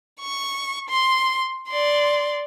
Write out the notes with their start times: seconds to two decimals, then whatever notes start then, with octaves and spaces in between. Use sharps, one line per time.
0.21 C#6
0.89 C6
1.69 D5 C6